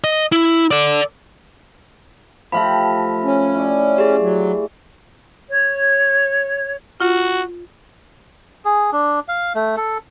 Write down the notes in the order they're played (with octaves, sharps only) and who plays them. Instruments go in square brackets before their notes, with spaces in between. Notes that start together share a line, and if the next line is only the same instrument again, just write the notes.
[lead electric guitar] D#5
E4
A4 D5
[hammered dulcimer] F3 A3 G4 [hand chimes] E5 F5 B5
[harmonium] C#4
[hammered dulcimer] E4 D5
[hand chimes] G4 G#4
[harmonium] F#3
[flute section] C#5
[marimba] F4 [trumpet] F#4
[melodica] G#4
D4
F5
A3
A4